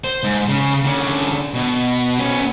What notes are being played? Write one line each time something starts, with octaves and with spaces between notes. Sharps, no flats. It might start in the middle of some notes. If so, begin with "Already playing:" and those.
C5
G#2
C#3
D3 C#4
B2
B3 C#4